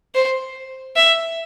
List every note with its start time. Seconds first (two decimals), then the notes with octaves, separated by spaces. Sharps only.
0.15 C5
0.96 E5